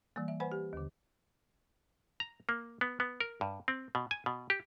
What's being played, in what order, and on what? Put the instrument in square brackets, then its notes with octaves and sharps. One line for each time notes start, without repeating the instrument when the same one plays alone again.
[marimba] E3 G3 A#3
E5
B4 C5 F#5 G#5 B5
G4
D#2 D3
[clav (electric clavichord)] A#5
A#3
B3
B3
A#4
G2
C4
B2
G#5
B2
G4